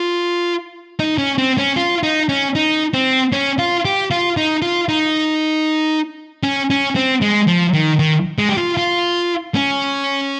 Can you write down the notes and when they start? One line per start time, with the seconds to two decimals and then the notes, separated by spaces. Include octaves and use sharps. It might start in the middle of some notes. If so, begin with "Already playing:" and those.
Already playing: F4
0.99 D#4
1.18 C#4
1.38 C4
1.58 C#4
1.77 F4
2.03 D#4
2.29 C#4
2.55 D#4
2.94 C4
3.32 C#4
3.59 F4
3.85 G4
4.11 F4
4.37 D#4
4.62 F4
4.89 D#4
6.43 C#4
6.70 C#4
6.95 C4
7.22 G#3
7.47 F3
7.74 D#3
7.99 D#3
8.38 G#3
8.49 G4
8.57 F4
8.77 F4
9.55 C#4